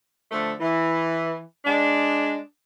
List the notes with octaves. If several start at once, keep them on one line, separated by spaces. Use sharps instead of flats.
D3 F3 A3
E3
G#3 D4